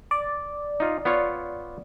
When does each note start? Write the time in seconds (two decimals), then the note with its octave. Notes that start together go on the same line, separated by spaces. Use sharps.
0.11 D5
0.80 D#4 F4
1.05 B3 F4 C#5